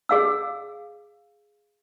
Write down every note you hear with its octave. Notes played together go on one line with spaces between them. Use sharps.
G#4 F5 E6